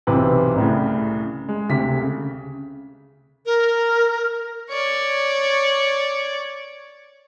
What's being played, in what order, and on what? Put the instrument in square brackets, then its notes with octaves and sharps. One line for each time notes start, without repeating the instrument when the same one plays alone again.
[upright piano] B1 C3 E3 C4 B4
C2 A2 C#3
G#3
D2 C3 B6
C#3
[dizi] A#4
[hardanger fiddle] C#5 D5